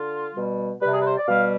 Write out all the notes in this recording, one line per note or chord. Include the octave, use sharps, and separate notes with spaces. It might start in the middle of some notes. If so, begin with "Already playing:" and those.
Already playing: D3 F4
B2 G3
C3 G3 B4
G#4
B4
C5
D5
B2 G3 F5